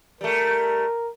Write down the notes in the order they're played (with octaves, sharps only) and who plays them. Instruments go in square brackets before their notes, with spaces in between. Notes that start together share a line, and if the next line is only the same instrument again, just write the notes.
[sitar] G3 A3 [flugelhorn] A#4